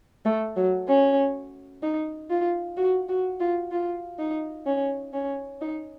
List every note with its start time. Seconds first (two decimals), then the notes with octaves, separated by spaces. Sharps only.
0.25 A3
0.56 F#3
0.88 C#4
1.83 D#4
2.30 F4
2.77 F#4
3.09 F#4
3.40 F4
3.72 F4
4.19 D#4
4.66 C#4
5.13 C#4
5.61 D#4